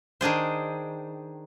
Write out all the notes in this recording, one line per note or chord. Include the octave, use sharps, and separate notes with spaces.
D#3 D4 G#4 C5